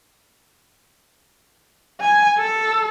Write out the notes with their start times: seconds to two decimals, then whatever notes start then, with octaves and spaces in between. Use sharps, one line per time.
2.01 G#5
2.38 A4